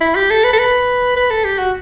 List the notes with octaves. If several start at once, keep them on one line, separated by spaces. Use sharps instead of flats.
E4
G4
A4
B4
A4
B4
B4
A4
G4
F#4